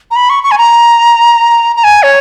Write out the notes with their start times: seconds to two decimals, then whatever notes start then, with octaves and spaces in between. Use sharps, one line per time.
0.11 A#5
0.16 B5
0.30 C#6
0.43 C#6
0.51 G#5
0.58 A#5
1.76 A#5
1.84 G#5
2.03 C#5